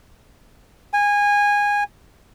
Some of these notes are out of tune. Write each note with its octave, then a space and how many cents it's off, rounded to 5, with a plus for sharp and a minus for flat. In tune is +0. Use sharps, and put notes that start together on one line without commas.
G#5 -20